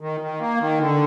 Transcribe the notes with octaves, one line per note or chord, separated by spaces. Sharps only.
D#3
D#3
A#3
D#3
D3